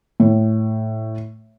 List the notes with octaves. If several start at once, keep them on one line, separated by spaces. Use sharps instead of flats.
A2